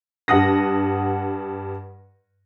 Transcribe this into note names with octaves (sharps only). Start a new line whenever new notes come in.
G2 F#5 D#6 A#6